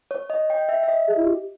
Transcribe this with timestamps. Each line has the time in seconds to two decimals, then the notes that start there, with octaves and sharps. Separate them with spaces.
0.11 C#5
0.30 D#5
0.50 G5
0.69 E5
0.83 E5
0.88 D#5
1.08 G#4
1.17 E4
1.27 G4